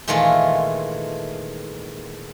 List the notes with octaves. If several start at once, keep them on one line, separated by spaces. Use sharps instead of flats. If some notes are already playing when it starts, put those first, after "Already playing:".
A#2 D#3 E3 G#3 A3 F4